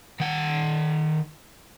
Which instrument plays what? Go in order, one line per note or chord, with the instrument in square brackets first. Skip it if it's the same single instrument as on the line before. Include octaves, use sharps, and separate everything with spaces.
[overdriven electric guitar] D#3 F#5